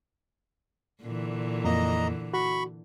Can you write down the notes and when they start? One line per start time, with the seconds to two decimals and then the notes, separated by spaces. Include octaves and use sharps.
1.02 A#2 D3 E3
1.65 F2 A#3 D#5 A#5
2.34 F#4 B5 C#6